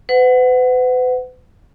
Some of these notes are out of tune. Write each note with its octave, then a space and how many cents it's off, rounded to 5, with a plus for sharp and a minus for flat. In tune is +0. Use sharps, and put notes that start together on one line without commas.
B4 +40 F#5 +0